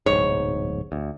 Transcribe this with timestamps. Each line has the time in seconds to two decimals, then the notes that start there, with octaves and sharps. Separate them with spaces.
0.06 D1 B1 G#2 C#5
0.92 D2